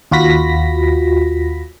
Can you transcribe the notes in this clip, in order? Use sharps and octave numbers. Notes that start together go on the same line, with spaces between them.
D#2 F4 F#4 B5 A#6 B6